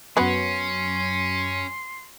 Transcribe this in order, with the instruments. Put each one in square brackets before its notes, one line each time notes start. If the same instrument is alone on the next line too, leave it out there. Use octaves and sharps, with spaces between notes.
[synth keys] F#2 F#3 [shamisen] B3 F#4 B4 [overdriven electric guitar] C#4 [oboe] C6